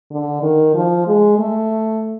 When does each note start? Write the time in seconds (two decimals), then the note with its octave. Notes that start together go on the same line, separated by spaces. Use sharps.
0.11 D3
0.42 D#3
0.74 F3
1.07 G#3
1.39 A3